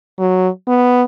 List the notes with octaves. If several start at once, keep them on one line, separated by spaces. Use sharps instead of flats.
F#3
B3